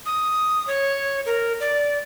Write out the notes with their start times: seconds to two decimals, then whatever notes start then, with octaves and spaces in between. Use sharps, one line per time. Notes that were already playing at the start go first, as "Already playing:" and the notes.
0.06 D#6
0.67 C#5
1.26 A#4
1.60 D5